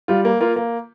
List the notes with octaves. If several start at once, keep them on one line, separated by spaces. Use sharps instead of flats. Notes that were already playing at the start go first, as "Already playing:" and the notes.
G3 F4
A#3
A#3 F4
A#3